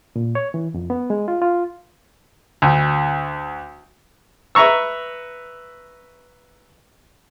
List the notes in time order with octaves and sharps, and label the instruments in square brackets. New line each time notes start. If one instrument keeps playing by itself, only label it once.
[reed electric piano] A#2
C#5
E3
F2
B3
G#3
F4
F4
[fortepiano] D2
B4 E5 A#5 C#6 E6